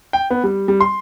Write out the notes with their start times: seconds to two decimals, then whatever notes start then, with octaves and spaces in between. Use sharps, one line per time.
0.13 G5
0.30 B3
0.44 G3
0.68 G3
0.81 C6